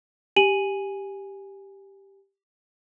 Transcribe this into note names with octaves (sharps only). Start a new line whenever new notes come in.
G4 G#5 D#7 F#7